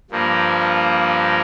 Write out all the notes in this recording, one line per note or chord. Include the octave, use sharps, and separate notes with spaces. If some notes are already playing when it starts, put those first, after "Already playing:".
G2 F3 A#3